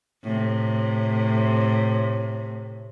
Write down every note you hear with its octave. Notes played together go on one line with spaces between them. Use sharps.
A2 C3